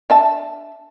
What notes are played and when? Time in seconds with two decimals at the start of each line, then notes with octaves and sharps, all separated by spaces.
0.10 D4 E5 A5